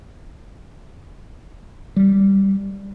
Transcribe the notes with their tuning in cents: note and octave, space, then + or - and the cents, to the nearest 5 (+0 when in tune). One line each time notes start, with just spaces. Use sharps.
G3 -5